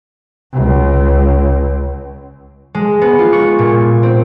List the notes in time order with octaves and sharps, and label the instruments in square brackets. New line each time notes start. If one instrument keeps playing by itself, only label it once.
[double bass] C#2
[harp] G#3
B3
F4
C#6
A#2
C4